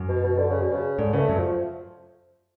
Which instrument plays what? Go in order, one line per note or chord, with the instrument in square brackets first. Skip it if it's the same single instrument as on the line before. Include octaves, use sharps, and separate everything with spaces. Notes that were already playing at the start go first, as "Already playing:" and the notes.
Already playing: [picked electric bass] F#2
[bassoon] B2
B2
D3
C#3
B2
C#3
[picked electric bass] G#2 [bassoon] D3
[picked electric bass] C#3 [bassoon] B3
[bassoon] A3
[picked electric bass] F#2
[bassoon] F3